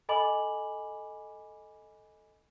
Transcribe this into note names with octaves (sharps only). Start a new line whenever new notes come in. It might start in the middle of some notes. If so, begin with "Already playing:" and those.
A4 D#5 G#5 B5 D6 F#7